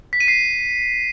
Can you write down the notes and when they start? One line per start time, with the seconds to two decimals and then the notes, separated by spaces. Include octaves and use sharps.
0.13 B6
0.20 D#7
0.28 C7